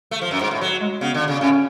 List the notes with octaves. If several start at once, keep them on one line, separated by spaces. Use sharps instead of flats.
A3
F3
F#2
G#2
A2
F#3
G#3
C#3 B3
D3
C#3
A2 C#4